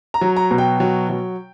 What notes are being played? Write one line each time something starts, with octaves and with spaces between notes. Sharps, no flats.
A#5
F#3
A#5
B2
G5
F#3
F#3